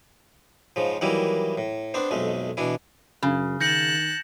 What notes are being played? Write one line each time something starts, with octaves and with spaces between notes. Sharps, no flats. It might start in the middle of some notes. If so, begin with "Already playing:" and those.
G#2 C#3 F3
D#3 E3 F#3 G3 A#3 E4
A2
B3 C4 D4 C5
B1 F2 G#3 A3
B2 E3 D4 E4
F#2 C#3
D#3 A5 F#6 G6 A#6 C#7